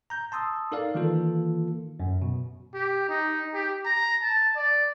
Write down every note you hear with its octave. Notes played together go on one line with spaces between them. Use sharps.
A#5 G6
A5 C6 D#6 E6
D#4 A4 A#4 D5 F5
D#3 E3 A#3 F4 A4
F#2
B2
G4
D#4
G4
A#5
A5
D5